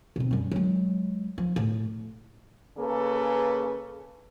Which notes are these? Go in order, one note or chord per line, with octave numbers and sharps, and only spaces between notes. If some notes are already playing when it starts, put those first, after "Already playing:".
B2 C4
F#2 G3
F#3 G#3
F3
A2
C#3 A#3 G#4 A4 B4